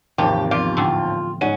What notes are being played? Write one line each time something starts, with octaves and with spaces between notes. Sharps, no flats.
G#1 D#2 C3 E3 F3 C4 G4
F3 B3 C4 F4 G4
A2 D3 A3 G5 G#5 C6
G#2 C#4 F#5 D#7